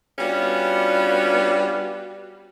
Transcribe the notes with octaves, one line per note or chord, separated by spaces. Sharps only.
G3 B3 C#4 D4 F4 F#4